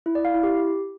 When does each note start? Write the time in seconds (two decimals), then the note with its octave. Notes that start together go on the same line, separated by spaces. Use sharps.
0.06 E4
0.15 D5
0.25 F5
0.34 E4
0.43 G4